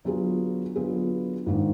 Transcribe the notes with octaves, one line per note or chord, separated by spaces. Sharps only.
D3 F#3 B3 F4 G#4
D3 F#3 B3 F4 G#4
G#2 D#3 A#3 D4